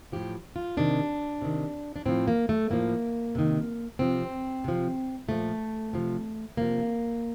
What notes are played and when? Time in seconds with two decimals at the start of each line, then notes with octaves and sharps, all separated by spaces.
0.12 A2 F3 G4
0.56 F4
0.77 C3 D#3 D4
1.42 C3 D#3
1.96 D4
2.05 A2 F3 C4
2.28 A#3
2.49 A3
2.70 A2 F3 A#3
3.35 C3 D#3
3.99 C3 F3 C4
4.64 C3 F3
5.28 A#2 F3 A3
5.93 C3 F3
6.57 C3 F3 A#3